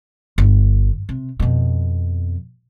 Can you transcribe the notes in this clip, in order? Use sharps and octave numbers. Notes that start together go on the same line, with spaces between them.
G1
C3
F2 B2